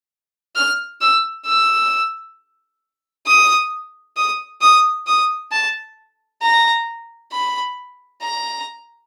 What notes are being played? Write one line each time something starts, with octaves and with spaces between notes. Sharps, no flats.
F6
E6
E6
D#6
D#6
D#6
D#6
A5
A#5
B5
A#5